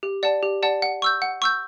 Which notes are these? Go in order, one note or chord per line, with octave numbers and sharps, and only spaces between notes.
G4
D5 F#5 A5
G4
D5 F#5 A5
F#5
C#6 E6 G6
F#5
C#6 E6 G6